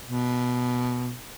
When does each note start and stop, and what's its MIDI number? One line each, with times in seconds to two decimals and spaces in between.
0.06 1.13 47